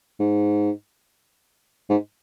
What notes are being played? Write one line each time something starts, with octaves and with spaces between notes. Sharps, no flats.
G#2
G#2